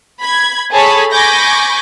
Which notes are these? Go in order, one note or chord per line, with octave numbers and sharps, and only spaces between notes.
B5 G#6
G#4 A4 C#5 A5 B5
G#5 B5 C#6 D6 G6 A#6